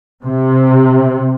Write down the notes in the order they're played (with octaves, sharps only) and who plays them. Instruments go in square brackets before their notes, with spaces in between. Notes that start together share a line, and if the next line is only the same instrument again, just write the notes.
[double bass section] C3